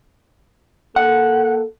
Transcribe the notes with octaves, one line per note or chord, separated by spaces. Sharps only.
A#3 A4 F#5